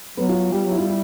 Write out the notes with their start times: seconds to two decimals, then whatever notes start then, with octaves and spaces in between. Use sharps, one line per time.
0.17 F#3 B3
0.29 F4
0.52 G3 G4
0.65 F#3 E4
0.78 G3 F4
0.87 E4